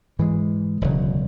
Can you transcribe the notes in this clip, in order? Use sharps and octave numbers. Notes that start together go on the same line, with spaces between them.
G#2 E3 G#3
E1 D2 C#3 F#3